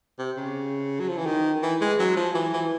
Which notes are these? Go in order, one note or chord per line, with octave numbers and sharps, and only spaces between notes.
C3
C#3
F#3
F3
E3
D#3
E3
G#3
F#3
F3
E3
E3